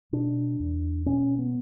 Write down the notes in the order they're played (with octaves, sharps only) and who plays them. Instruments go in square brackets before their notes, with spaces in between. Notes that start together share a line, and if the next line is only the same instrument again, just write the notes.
[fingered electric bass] B2 D4
E2
B2 C#4
B3